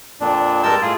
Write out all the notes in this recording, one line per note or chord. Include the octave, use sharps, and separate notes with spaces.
F2 A#2 D4
G2 G#3 A#4 A5 E6 G6
A2 F4 G#4